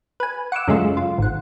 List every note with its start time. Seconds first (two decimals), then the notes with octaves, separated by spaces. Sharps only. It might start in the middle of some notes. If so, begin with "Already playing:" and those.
0.20 B4 G#5
0.52 F#5 C#6 D6 E6
0.68 F#2 C#3 G#3 A3 F4
0.97 F4
1.18 G#1 F#5